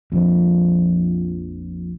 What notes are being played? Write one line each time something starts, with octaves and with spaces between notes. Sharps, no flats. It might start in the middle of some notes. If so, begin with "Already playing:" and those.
A#1 F2